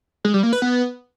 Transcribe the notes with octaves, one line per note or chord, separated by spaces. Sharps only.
G#3
G3
A#3
B4
B3